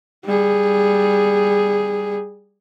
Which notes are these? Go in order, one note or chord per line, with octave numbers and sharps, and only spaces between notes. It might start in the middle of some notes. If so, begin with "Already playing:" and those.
G3 G#4